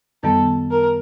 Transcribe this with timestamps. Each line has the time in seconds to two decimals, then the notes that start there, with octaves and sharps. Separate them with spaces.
0.23 F#2 D#3 G3 B3 A4
0.71 A#4